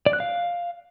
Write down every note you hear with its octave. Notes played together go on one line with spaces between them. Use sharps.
D5
F#6
F5